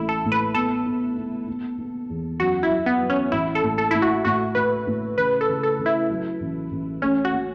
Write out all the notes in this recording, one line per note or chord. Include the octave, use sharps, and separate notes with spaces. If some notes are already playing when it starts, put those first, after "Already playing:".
Already playing: A1 A3 E4
A4
A2
B4
B3 A4
B3
B3
B3
B3
E2
F#2 F#4
E4
F#3
B3
F#3
C#4
A1 E4
A4
A2
A4
A2 E4
F#4
A2 F#4
A2 B4
A2
C#3 B4
A4
C#3
A4
C#3
E4
F#3
A1
A1
A3 C#4
F#4
A3